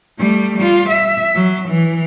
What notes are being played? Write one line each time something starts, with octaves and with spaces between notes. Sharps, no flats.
G3 A3
G3 F4
E5
F#3
E3